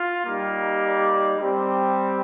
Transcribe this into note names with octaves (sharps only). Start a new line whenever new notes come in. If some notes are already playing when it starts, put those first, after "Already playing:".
Already playing: F4
G3 A#3 D#4 G4
D5
G3 C4 G4